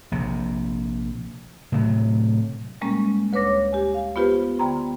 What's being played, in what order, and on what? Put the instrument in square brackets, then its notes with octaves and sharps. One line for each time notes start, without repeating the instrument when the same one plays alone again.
[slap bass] A#1 C3
A2 C3 F#3
[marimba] A#2 G3 G#3 A#3 C#4
D2 B4 C#5 D6 A#6
G4 G#5
F5
B3 F4 G4 B4 C5
D3 B3 G5 A#5 C6